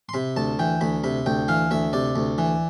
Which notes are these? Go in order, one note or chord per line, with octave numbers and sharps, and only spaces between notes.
C6
C3 B5
D2 A5
E3 G5
D2 B5
C3 B5
D2 G5
E3 F5
D2 E5
C3 D5
D2
E3